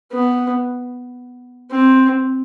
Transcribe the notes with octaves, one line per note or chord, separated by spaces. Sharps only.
B3
C4